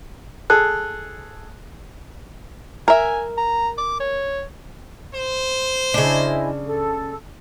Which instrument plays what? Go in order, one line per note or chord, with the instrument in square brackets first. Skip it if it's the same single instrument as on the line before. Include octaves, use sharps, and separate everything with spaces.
[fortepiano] G#4 A4 [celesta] F#6
[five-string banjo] A#4 E5 [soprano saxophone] G#5
[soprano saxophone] A#5
D6
C#5
[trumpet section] C5
[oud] C#3 D4 [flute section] E4 D#5 G#5
[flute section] A4